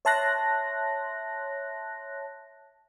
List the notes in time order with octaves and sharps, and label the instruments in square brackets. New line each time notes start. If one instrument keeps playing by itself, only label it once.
[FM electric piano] C#5 E5 A5 C6 F#6 A#6